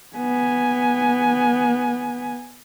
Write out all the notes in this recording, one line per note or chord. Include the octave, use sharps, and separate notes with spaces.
B3 G#5